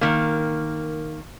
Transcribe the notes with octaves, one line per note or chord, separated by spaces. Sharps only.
D#3 A#3